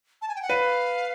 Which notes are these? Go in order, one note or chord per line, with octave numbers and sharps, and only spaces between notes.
A5
G#5
G5
F#5
B4 F5